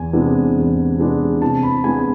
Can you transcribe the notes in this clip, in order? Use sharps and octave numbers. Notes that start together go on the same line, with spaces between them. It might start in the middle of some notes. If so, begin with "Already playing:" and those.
Already playing: E2 G#5
C3 G#3 B3 D4
E2
C3 G#3 B3 D4
C3 A5
B5
G#3 B3 D4 G#5